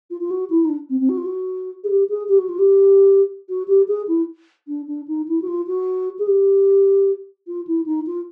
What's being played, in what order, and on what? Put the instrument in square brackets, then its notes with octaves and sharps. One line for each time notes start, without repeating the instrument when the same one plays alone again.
[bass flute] F4
F4
F#4
E4
D#4
D4
C4
C4
F#4
F4
F#4
G#4
G4
G#4
G4
F#4
F4
G4
F#4
G4
G#4
E4
D4
D4
D#4
E4
F#4
F4
F#4
G#4
G4
F4
E4
D#4
F4